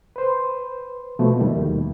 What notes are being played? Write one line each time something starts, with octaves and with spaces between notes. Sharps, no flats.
B4 C5
B2 F3 A3
D#2 D#3 G3